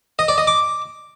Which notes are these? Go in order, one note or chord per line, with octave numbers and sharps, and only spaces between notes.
D#5
D5
D#5
D6